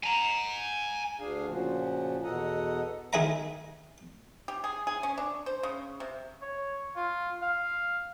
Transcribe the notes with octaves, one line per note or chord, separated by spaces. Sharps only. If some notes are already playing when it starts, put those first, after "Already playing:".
G#5 A#5
D2 D4 G#4 F5
A#2 C#3 F3 F#4
E2 B2 A4 D#5 F#5 A#5
D#3 G#4 E5 A#5
G4
G#4
G#4
C#4
D4
C5
C#3
C3
C#5
F4
F5